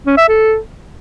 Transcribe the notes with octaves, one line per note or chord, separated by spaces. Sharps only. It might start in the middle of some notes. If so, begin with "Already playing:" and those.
C#4
E5
A4